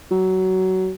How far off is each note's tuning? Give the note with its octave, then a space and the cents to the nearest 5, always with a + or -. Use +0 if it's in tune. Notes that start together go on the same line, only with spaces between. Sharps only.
F#3 +20